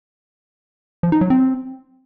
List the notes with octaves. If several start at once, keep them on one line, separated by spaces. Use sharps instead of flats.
F3
D#4
F#3
C4